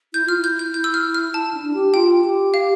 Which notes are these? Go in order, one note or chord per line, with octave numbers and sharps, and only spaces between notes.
E4 G6
F4 F6
E4
G6
G6
E4 G6
E6
F6
F6
E4 A5
D4
G4
F4 G5
G4
F5